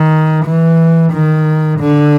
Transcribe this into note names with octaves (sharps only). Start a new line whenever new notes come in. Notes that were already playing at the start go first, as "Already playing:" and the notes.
Already playing: D#3
E3
D#3
D3